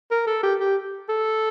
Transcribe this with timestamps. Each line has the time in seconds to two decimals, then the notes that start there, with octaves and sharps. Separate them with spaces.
0.11 A#4
0.27 A4
0.43 G4
0.60 G4
1.09 A4